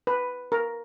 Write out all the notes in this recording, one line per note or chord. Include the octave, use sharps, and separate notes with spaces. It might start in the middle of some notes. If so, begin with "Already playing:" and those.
B4
A#4